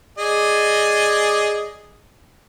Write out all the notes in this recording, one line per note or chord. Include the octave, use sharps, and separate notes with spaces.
G#4 D5 D#5